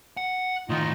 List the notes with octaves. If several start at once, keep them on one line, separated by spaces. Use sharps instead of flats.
F#5
A2 D#3 D#4 F4 D#5